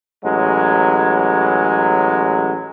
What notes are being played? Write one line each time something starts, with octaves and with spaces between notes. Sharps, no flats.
A1 F#3 G#3